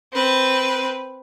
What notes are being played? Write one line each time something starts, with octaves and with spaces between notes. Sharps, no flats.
C4 B4